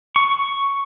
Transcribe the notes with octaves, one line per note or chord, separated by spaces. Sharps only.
C#6